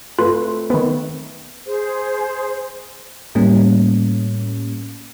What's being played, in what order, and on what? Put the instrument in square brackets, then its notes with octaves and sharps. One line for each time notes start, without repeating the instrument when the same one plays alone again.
[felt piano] A3 C4 B4 [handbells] F4
[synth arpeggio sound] D#3 B3
[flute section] G#4 C5
[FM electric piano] A2 G3 A#3 C#4